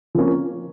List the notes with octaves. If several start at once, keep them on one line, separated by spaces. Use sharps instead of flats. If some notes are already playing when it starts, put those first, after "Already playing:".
F3 A#3 C#4